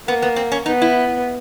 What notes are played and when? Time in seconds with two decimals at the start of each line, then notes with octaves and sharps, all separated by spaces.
0.08 A#3 B3
0.22 B3
0.36 C4
0.52 C#4
0.66 B3 D#4
0.82 E4